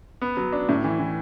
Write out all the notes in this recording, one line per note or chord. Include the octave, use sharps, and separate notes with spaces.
B3
F#3
D4
A2
E3
E3